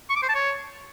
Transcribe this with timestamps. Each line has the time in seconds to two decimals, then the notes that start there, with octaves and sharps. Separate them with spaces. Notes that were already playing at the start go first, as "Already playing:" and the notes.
0.10 C#6
0.16 D6
0.22 C5
0.29 A5
0.35 C#5